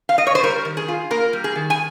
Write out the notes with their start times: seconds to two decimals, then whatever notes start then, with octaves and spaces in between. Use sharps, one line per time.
0.09 F5
0.18 D#5
0.27 C#5
0.35 C5
0.43 G3 A#4
0.65 D#3
0.77 G#4
0.88 F4
1.11 A#3 A#4
1.33 G3
1.44 G#4
1.55 D#3
1.70 G#5